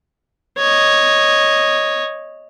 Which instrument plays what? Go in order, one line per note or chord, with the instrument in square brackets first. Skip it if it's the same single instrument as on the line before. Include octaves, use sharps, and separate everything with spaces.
[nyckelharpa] C#5 D#5